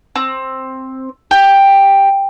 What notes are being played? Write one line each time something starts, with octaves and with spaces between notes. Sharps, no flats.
C4
G4